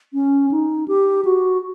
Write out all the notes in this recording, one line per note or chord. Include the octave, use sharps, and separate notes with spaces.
C#4
D#4
G4
F#4